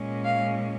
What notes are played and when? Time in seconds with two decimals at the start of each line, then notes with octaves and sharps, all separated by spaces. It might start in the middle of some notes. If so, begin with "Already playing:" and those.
Already playing: A#2 G#3 C#4
0.24 F5